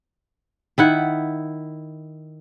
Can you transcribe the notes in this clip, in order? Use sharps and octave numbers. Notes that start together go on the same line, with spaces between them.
D#3 E4 F#5